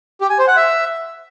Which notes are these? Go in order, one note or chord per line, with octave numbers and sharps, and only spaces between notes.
G4
G#5
C5
F#5
E5